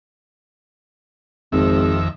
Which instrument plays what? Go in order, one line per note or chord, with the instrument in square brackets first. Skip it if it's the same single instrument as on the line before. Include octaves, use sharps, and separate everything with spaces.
[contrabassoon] G#1 [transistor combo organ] F2 D#3 E5